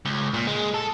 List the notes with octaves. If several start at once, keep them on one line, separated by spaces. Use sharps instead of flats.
C#2
A#2
G#3
A4